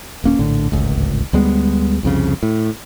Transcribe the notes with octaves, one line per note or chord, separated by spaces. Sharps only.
D#1 A#3 C#4
A#1 A2 D3
D1 G#1 C#2
D2 G3 G#3 B3
C2 F2 C#3
A2